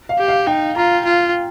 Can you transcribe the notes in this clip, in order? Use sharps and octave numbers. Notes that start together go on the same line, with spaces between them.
F5
G4
F5
D#4 G5
F4 A#5
F4